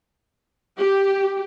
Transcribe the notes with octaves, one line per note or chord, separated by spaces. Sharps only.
G4